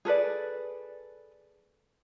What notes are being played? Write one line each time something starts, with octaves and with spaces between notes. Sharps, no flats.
G#4 A4 B4 D5